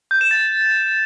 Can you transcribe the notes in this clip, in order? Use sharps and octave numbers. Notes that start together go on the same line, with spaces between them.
G6
E7
A6